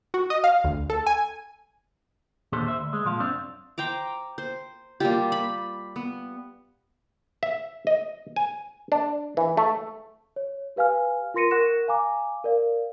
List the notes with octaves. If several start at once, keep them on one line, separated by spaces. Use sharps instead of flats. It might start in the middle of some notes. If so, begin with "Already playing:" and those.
F#4
D#5
F5
D2
A4
G#5
D#2 A#2 D3 G4 A4 C5
C5 E5
D2
G#3
A#2 F3 F5
C2 F#2 C4 D4 F5
C5 G5 A#5 D6
C5
G3 A#3 F4 G4
B5
B3
E5
D#5
G#5
D4
E3
A3
C#5
G4 B4 F5 G#5 F6
F4 A#4 C6 A#6 C#7 D#7
A#4 F#5 C#6 F#6 A#6 E7
F5 G#5 A#5 D6
A#4 D5 F5